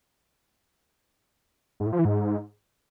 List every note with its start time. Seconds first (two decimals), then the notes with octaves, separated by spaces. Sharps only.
1.80 G#2
1.86 A2
1.93 F3
1.99 E3
2.05 G#2